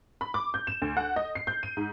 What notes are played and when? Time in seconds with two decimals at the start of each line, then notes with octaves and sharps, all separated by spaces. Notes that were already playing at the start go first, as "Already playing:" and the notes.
0.21 B5
0.34 D6
0.54 G6
0.67 E7
0.82 D2
0.97 F#5
1.16 D#5
1.35 C7
1.47 G6
1.63 D#7
1.77 G#2